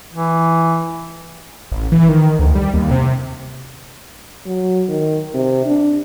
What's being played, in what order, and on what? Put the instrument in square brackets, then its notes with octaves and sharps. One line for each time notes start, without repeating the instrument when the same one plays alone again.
[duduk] E3
[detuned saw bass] A1
E3
D#3
D2
G3
D#2
C3
[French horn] F#3
D#3
C3
D4